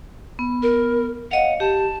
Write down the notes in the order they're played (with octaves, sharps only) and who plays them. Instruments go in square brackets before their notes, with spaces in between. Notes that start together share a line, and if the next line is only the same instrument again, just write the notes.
[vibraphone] B3
[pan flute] A#4
[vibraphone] C#5 D#5 F5 [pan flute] F#5
[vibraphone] G4 [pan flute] A5